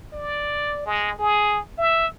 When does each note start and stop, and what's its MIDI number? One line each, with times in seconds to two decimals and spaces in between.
0.13 0.83 74
0.86 1.16 56
1.19 1.59 68
1.78 2.06 76